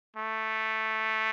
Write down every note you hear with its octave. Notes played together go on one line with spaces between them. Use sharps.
A3